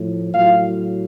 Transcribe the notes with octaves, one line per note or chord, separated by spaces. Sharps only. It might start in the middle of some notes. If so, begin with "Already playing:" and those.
Already playing: A2 F3
A2 F#3 F4 F5